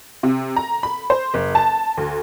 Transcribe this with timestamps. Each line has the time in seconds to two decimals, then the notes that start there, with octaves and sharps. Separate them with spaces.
0.23 C3
0.56 A#5
0.83 B5
1.10 C5
1.34 F#1
1.55 A5
1.97 D2